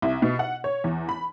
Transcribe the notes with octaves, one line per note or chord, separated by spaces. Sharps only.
C2
B2
F#5
C#5
E2
B5